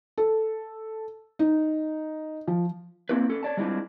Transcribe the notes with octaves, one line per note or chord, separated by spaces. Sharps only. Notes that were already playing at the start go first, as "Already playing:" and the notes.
A4
D#4
F3
A#3 C4 E4 B4
C#4 A4
C#5 D5 A5
G3 G#3 C4 D4 E4 F4